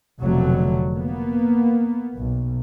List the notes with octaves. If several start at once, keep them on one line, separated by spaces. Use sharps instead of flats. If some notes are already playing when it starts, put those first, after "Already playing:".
F1 F2 B2 D3 F#3 A3
A#3 B3
B1